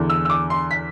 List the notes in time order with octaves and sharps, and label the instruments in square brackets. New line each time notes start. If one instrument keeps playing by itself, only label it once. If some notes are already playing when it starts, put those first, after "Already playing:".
Already playing: [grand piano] E2 D3
E6
E6
D6
C6
B6